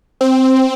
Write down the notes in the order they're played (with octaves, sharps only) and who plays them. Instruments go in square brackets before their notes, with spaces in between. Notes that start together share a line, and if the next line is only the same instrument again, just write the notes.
[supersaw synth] C4